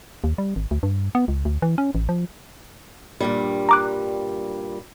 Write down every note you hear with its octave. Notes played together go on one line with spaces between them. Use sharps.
D#2
G3
G#1
D2
G2
B3
C#2
D2
E3
C#4
A1
F3
G2 A#2 G3
A#5 D6 F#6